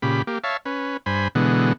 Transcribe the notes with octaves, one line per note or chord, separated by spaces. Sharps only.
A#2 C#3 G4 B5
A#3 G4
C#5 E5 F5 A5
C#4 B4
G2 C5 G#5 B5
B2 D3 E3 G#3 B3